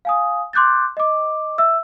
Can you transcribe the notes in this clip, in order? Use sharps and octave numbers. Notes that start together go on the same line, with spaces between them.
F5 G#5 D#6
C6 D6 F#6 G6 A6
D#5 D6
E5 E6